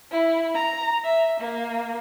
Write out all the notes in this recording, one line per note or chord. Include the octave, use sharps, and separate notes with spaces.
E4
A#5
E5
A#3